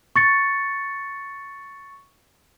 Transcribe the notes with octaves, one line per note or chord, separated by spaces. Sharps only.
C#6 A6 C#7